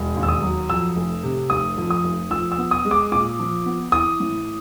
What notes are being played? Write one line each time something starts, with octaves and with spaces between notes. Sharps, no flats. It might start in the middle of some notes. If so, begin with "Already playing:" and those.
Already playing: E1
D#2
E6
D#6
F#3
F2 E6
F1
C3
F1 D#6
F2
D#6
F1
F3 E6
E6
B3
D#6
G#3
D6
A#2 D6
F3
B3
E3 D#6
A2